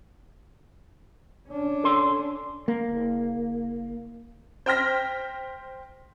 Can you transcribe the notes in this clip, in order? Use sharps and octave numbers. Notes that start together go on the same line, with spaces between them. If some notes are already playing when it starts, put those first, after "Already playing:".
C#4 D4
A4 C6
A#3
F#1
C5 G5 F6 A#6 B6